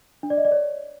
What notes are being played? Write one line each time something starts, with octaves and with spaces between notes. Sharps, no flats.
D4
D5
D#5
D5
C#5